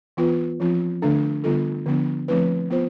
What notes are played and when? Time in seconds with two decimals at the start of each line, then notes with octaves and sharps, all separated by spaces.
0.17 E3 B3 F4 B4
0.60 F3 C4 F4
1.02 D3 A3 D4 A4
1.44 D3 G3 B3 F4 A4
1.86 D3 F3 B3 D4
2.28 F3 A3 C4 E4 B4
2.70 B3 F4 C5